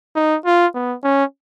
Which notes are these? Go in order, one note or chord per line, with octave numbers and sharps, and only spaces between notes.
D#4
F4
B3
C#4